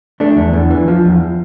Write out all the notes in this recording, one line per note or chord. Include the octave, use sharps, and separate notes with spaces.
A3 D4
E2
E2
E3
F3
E2